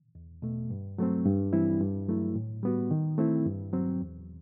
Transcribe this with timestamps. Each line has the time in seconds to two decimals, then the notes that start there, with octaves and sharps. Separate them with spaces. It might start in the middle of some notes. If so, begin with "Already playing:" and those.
0.15 E2
0.42 B2 A3
0.70 G2
0.98 F#3 A3 C4
1.25 G2
1.53 E3 G3 C4 E4
1.80 G2
2.08 F#3 A3 E4
2.35 A2
2.63 G3 B3 F#4
2.91 D#3
3.18 A3 C4 E4
3.46 G2
3.73 F#3 C4
4.01 E2